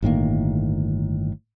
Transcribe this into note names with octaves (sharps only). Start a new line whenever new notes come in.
G1 A2 D#3 A#3